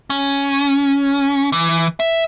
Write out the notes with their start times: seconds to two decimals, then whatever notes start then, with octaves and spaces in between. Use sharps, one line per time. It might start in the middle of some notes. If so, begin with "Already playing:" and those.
0.10 C#4
1.52 E3
2.00 E5